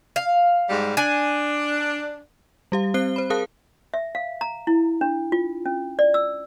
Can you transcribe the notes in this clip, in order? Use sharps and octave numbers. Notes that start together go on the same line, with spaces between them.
F5
G#2 G3
D4 G#5
G3 G4 F5
C4 C5 F#6 C7 G7
C5 B5
G#4 A#4 F5 A5 D#6 F#6
E5
F5
A#5
E4
D4
F4
C#4
D5
E6